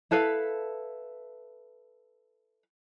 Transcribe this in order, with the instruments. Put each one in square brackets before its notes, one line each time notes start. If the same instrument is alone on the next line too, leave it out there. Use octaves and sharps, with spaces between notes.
[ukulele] E4 A4 B4 F5